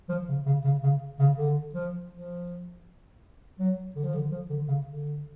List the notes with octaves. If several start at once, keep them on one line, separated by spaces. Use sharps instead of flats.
F3
C#3
C#3
C#3
C#3
C#3
D3
F3
F3
F#3
D3
F3
D3
F3
D3
C#3
D3